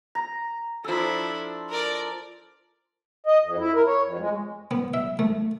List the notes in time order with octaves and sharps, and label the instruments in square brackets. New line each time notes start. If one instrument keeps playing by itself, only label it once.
[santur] A#5
[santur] F3 A4 [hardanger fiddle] D4 E4
[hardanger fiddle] A#4 D5
[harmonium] D#5
F2
E4
A#4
C#5
F2
G#3
[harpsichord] B3
E5
A3